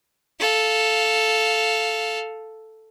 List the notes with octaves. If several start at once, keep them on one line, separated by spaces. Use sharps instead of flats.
A4 F5